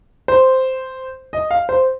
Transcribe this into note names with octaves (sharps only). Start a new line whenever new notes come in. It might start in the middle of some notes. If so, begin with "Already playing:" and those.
C5
D#5
F5
C5